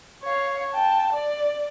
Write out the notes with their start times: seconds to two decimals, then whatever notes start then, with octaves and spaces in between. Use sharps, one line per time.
0.23 C#5 F5
0.72 G5 A5
1.13 D5